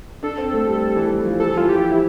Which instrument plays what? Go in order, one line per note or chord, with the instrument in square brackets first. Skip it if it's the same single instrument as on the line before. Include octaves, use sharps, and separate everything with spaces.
[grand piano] D4 [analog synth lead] A4
[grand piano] C4
A3
G3
E3
E3
F3
[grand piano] G3 [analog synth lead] A4
[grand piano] E3 [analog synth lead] F4
[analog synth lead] G4
[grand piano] F3
[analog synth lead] E4